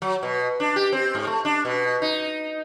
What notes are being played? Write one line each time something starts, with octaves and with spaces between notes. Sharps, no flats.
F#3
B2
D4
G4
C4
G#2
A3
D4
B2
D#4